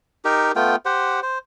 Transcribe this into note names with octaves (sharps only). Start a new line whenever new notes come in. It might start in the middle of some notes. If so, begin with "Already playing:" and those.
D#4 G4 A#4
A3 B3 F4 G5
G4 C5 F#5
C5